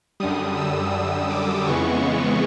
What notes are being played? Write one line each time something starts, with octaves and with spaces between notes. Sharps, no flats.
F#2 D3 G3 D#6
E6
D#6
D6
F2 C#3 E3 G#3 B3 C#6